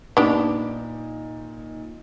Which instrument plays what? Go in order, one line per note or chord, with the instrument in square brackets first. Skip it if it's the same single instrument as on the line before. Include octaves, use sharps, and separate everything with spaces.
[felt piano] A#2 D#4 [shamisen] B3 D4 G4